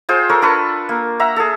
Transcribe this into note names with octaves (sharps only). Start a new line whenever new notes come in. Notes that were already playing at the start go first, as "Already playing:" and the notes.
F4 G#4 C5 G5
A4 A#4 C#5
D4 A4 B4 C#6
A#3
E5 F#5 A#5
G#4 A4